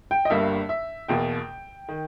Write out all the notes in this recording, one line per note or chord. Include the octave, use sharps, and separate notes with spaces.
G5
D#5
G1 G2 G3 A#3 E5
E5
E2 B2 A#3 G5
D#3